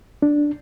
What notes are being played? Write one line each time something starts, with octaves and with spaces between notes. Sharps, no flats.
D4